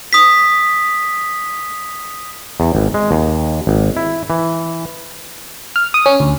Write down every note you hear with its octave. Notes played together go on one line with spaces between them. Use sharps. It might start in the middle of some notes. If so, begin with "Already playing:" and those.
D#6 B6
E2
G#1
G#3
D#2
G#1
E4
E3
F6
D#6
C#4
D2